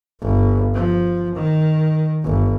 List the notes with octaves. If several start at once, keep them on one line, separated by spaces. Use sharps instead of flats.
G1
F3
D#3
G1